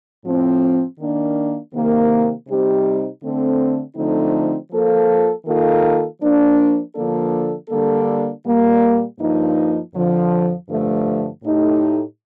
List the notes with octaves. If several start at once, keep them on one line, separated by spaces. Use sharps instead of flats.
A2 F3 C4
D#3 A#3 D4
C3 D#3 A#3
C3 G3 C4 D#4 G4
D3 A3 C4
D3 F3 A3 C4 D#4
F3 A#3 F4 A4
D#3 A#3 F4 A4
F3 A#3 D4
D3 F3 A#3 D4 A4
D3 G3 A#3 D4 A4
A#2 G3 A#3
G2 F3 A#3 D#4
F2 D3 F3
G2 D3 F3 A3
A2 A3 D#4 G4